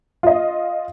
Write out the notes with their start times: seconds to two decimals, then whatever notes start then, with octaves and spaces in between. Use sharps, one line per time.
0.23 F4 D#5